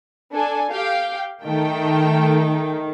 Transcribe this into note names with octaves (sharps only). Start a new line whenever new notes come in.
D4 A4 G#5
G4 F5 G5
D#3 A3 G5